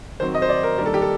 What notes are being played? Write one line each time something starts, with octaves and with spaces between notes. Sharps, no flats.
D#3 F#3 C4 C5
D#5
C5
D5
A#4
D#3 G3 A#3 D4 A#4
A4
G4
A4